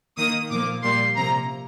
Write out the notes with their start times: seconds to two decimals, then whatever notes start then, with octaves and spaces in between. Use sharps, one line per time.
0.18 D#3 A#3 D#6
0.50 A#2 F3 A#3 D6
0.83 A#2 G3 A#3 C6
1.16 C3 F3 A#3 A#5